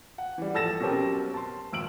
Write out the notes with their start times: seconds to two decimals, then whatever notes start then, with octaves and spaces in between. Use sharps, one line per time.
0.18 F#5
0.38 E3 G3
0.54 A#1 A4 E6 A6 A#6 E7
0.80 B2 F#3 C4 C#4 G4 A#4
1.34 A5 C6
1.73 G#1 E6 D7 F#7